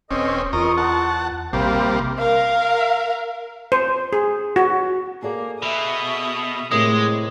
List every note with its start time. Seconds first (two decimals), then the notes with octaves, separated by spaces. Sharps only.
0.11 D#1 C4 C#4 A4 B4 D#5
0.53 E2 F4 A#4 D#5 C#6
0.77 F#5 A5
1.53 A#1 C3 G3 A#3 C5 F5
2.19 A#4 F5
3.72 C5
4.13 G#4
4.56 F#4
5.22 A#3 G#4 A4 D5
5.62 B2 E5 D#6
6.72 A2 C3 G#3 A#4 D#6